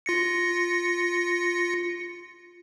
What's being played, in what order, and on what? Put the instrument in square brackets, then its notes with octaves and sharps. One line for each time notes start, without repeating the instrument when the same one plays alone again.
[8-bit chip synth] F4 A#6 C#7